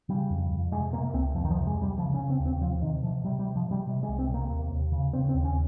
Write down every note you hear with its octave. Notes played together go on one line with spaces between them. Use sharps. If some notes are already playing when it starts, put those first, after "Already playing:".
C#3 G3
F2
F2
C3 G#3
C3 A#3
A#3
C#2 C4
F2 F3
D#3
F3
C3
G#3
C3
G3
C#3 F3
C#4
C#3
C4
D#2
C4
C3 F3
C3 D#3
C3 F3
C3 G3
G3
C3
F3
C3
G3
C3 G3
G#3
C2
C4
C3 A#3
D#2
D#2
C#3
C#3 C4
C4
D#2
C#4